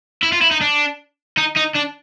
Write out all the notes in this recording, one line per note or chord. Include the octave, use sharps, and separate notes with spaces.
E4
F4
E4
D#4
D4
D#4
D#4
D4